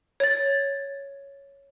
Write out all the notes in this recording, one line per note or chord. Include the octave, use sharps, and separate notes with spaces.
C#5 A6